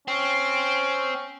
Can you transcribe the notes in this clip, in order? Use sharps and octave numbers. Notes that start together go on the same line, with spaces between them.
C4 C#4